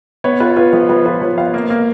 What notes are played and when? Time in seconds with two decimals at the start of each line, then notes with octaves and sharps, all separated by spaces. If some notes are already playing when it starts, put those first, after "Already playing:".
0.24 B3 C#5
0.40 F4 B4
0.56 F4 B4
0.73 F3 B4
0.89 F3 B4
1.05 F4 B4
1.21 F3 C#5
1.38 B3 F5
1.54 A#3
1.70 A#3